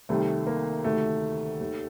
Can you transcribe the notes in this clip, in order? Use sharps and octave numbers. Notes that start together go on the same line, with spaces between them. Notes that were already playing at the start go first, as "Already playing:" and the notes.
C2 C3 D#3 A3
A#3
D2 C3 D#3 A3
D#2 D#3